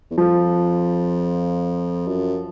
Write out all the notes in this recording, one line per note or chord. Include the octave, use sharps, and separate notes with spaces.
E2
F2 F3
F#2